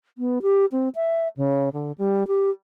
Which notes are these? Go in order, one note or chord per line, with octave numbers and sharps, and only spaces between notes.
B3
G4
C4
E5
C#3
D3
G3
G4